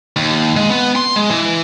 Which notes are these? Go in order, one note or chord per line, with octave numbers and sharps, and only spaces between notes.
D#2
G#3
B3
C6
G#3
E3